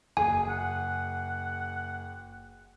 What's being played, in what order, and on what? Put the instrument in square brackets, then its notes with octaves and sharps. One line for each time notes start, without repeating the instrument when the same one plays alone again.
[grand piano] F#1 G#4 [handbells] G#5
[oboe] F#5